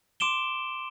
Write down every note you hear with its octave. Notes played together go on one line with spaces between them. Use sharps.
C6 D6 D7 E7 G7